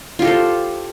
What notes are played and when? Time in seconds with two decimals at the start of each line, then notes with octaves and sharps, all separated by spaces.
0.19 F4
0.22 G4
0.25 A4
0.27 C5